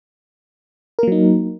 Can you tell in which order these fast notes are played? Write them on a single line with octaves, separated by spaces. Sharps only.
A#4 A#3 F#3 D#4